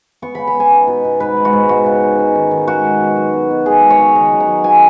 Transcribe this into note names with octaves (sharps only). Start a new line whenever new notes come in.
B3 C#6
C#3 B5
B5
B3
G#5
D#4
B2
B2
G#2 B4
G#3
F#4
G#2
B3 F#4
C#3
D#4
C#4
D#3
D#3
G#3 F#4
B2
B2
F#3
B2
B2
G#3 G#4
B3
C#5
C#3
D#3 D#5
F#3
F#5
F#3
B2 G#5